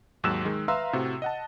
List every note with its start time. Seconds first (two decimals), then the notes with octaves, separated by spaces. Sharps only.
0.24 D#2 G#2 F#3 E6 F#6 E7
0.45 D#3 G#3
0.68 B4 E5 F5 A#5 C6 E6
0.93 A2 C3 F#4
1.22 D#5 F#5 A5